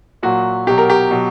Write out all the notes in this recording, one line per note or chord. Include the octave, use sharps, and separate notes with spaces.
A#2 F#3 F#4
B2 F#3 G4
A#4
G4
B2 F#3